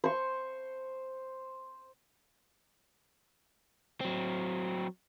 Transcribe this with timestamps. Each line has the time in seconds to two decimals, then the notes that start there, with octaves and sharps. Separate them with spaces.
0.04 C5 C#6
4.01 F#3 C4